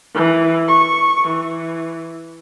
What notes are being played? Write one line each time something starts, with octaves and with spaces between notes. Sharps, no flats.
E3
C#6
E3